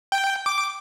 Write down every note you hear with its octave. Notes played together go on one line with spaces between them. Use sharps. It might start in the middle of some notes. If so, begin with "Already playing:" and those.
G5
D6